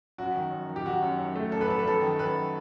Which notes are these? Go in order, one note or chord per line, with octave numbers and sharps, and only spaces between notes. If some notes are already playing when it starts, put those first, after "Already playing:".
F#2 F#4
D#3
F#2
D#3
G4
D#3 F#4
F#2
F#2
A3
F#2 A4
B4
F#2 A4
B4
F#2 A4
D#3
F#2 B4